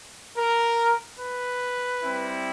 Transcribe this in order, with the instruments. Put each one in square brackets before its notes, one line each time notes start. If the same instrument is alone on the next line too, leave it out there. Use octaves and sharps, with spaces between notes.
[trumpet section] A#4
B4
G3 C4 E4